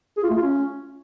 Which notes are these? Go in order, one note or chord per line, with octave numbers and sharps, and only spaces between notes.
G#4
F4
A3
F4
C#4